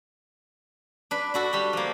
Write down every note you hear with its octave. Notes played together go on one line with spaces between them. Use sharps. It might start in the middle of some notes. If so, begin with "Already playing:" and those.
D4 B4
D4 F#4 A4
G3 G4
F3 A#3